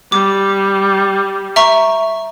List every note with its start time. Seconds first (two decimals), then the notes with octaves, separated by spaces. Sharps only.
0.12 G3 D6
1.56 E5 A#5 C#6